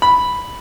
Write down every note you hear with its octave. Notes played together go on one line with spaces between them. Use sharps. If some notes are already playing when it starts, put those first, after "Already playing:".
B5